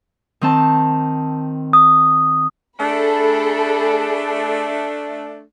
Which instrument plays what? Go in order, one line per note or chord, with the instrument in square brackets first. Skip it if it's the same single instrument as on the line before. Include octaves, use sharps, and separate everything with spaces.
[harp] D#3 C4 A5
[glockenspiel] D#6
[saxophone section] A3 D4 [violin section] G#4 A4 B5